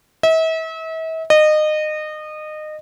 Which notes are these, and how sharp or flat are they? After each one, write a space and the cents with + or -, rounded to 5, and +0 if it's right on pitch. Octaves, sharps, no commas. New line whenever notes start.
E5 -40
D#5 -25